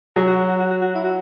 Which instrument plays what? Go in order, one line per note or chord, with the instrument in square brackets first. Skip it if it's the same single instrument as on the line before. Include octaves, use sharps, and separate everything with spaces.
[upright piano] F#3 [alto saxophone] G#4
[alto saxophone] F#4
F#4
F#4
F#4
F#4
F#4
E4
F#4